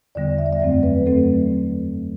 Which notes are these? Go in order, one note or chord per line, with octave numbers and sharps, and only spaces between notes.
E2 D3 G3 B3 D5
E5
D5
E5
F#2 F#3 A3 C4 D5
B4
F#2 F#3 A3 C4 A4